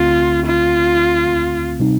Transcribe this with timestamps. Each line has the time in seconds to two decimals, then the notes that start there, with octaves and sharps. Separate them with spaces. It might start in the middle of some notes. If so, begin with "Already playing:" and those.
Already playing: D2 D3 A3 C4 F4
0.46 F4
1.79 C3 G3 C4 D#4